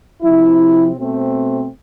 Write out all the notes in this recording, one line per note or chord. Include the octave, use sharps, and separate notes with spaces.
C3 F3 C4 E4
B2 A3 C4